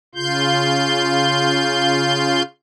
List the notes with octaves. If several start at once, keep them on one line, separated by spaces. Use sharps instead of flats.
C#3 F4 C6 G6